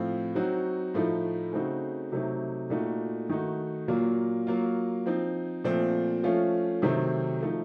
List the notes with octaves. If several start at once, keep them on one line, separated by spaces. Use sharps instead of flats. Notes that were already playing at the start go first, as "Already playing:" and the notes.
Already playing: A2 F3 C4 F4
F#3 C4 D#4 F#4
A2 F3 A3 D#4
C#3 A3 C4 D#4 F#4
C3 F#3 A3 C4 D#4
A#2 A3 D#4 F#4
D#3 A3 D#4 F#4
A#2 F#3 A#3 F4
F#3 A#3 F4
F3 C4 D#4
A#2 F3 A3 C4
F3 A3 C#4 F4
C3 D#3 F#3 A3 C4
F3 A3 D#4